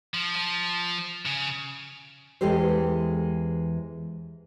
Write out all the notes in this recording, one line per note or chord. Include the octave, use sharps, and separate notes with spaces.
F3
F3
C#3
E2 E3 G#3 G4 A4 C5